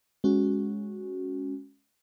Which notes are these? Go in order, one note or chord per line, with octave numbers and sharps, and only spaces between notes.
G#3 C#4 F#4